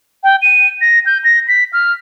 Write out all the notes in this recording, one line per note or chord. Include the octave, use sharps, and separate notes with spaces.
G5
D#7
A#6
G6
A#6
B6
F6